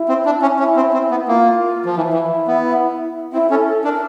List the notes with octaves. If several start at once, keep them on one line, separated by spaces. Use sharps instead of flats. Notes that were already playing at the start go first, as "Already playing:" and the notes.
Already playing: E4
C4
D4
C#4
C#4 E4
C4
C4
B3
A#3 F4
F3
E3 E4
E3
B3
C4 E4
C#4 A4
A4
D4 A#4